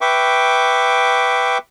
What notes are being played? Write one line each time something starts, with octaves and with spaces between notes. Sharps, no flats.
B4 E5 G5 C#6 D6